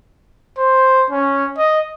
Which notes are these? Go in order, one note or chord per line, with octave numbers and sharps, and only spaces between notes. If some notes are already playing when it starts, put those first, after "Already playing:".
C5
C#4
D#5